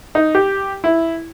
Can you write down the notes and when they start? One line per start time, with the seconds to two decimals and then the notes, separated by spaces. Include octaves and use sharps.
0.15 D#4
0.35 G4
0.84 E4